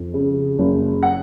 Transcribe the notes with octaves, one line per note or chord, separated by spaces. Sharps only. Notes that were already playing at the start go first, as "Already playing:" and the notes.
Already playing: F2
C#3
F#1
F#5